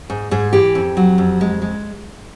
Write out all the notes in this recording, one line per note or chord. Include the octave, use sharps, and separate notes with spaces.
G#2
G#2 G#4
E3 G4
F2
F#3
F2
G#3
G#3